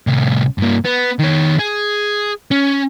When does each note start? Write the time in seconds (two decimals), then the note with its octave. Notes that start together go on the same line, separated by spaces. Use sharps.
0.07 C2 A2
0.58 G2 A#3
0.85 B3
1.19 D#3 C#5
1.59 G#4
2.51 C#4